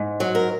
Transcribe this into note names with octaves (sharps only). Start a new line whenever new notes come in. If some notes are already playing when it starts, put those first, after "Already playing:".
Already playing: G#2
F#3
A#4